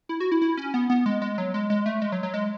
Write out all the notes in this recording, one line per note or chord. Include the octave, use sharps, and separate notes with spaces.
E4
F#4
E4
E4
C#4
B3
B3
G#3
G#3
F#3
G#3
G#3
A3
G#3
F#3
F#3
G#3